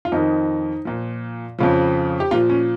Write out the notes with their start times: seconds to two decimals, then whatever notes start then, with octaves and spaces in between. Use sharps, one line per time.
0.05 F4
0.12 F2 D#3 D#4
0.85 A#2 F3
1.59 F2 C#3 F3
2.20 G4
2.31 A#2 F3 F4
2.50 C#4